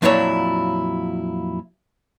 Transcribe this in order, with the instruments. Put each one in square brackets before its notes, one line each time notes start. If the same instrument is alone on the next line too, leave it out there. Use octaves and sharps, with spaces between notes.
[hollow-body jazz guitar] F2 A#2 F#3 D4 E4 C#5